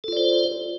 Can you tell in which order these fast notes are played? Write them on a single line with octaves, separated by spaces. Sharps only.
A4 F4 D5 C5